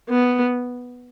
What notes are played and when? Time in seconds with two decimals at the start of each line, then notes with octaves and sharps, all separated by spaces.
0.10 B3